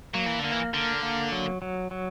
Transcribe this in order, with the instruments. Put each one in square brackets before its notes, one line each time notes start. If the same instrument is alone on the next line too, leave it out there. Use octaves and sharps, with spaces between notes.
[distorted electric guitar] F#3 [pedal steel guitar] A#3
[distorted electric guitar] E3
[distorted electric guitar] D3 [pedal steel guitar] A#3
[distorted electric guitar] E3
[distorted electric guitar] D3 [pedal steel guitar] A#4
[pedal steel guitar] A#3
F#3
F#3
F#3